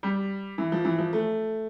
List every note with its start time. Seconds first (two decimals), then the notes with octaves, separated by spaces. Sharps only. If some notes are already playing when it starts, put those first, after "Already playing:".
0.03 G3
0.58 E3
0.72 F3
0.85 E3
0.98 F3
1.13 A3